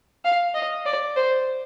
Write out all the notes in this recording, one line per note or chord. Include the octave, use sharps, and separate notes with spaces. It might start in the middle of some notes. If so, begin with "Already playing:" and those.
F5
D#5
D5
C5